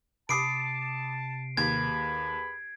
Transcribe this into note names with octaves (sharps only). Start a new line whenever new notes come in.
C3 A5 B5 D6 D#6 C7 D7
D#2 G#4 B4 B5 G#6